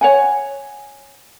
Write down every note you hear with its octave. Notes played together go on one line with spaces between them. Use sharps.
C#5 F#5 G#5